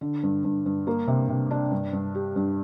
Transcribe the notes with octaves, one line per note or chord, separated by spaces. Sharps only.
D3
G2
G2
G2
A#3
C3
C3
D4
G2
G2
G4
G2